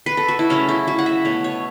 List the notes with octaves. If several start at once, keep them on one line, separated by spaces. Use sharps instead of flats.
B4
A4
F#4
E4
C#3 F#3 A3 C#4
E4
F#4
F#5
E5
B2 A3 C#5
C#5